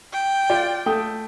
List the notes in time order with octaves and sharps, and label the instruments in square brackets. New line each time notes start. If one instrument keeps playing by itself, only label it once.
[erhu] G5
[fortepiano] F4 D5
A3 G5 D#6